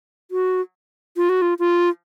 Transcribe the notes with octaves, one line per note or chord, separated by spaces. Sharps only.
F#4
F4
F#4
F4
F4